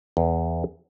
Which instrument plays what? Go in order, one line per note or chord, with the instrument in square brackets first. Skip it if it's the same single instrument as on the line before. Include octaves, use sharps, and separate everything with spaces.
[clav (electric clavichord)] E2